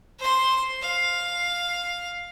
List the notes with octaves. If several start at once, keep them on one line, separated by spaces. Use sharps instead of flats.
C5 C6
F5